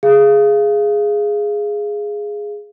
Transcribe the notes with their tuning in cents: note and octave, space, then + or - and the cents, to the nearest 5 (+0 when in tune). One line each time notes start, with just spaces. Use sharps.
G#4 +0 F5 -25